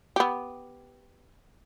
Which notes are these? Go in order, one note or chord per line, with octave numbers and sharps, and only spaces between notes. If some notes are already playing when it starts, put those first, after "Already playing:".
B3 G4